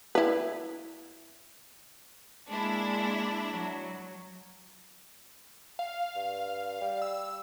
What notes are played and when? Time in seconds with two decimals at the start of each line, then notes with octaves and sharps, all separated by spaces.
0.15 E4 B4
2.49 G#3 A#3 D4 E4
3.50 F#3
5.79 F5
6.16 G2
6.81 G3
7.02 E6